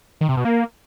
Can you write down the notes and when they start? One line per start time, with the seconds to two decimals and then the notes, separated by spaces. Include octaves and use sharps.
0.21 D#3
0.29 C3
0.37 B2
0.45 A#3